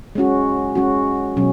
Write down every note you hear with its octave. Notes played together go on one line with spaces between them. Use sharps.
G#3 C#4 F#4
G#3 C#4 F#4
B2 F#3 C#4